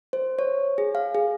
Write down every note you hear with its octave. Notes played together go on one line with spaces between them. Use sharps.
C5
C#5
G#4
F5
G#4